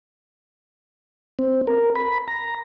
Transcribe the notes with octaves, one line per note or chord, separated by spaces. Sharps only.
C4
A#4
B5
A#5